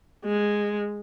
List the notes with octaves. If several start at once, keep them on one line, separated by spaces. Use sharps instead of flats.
G#3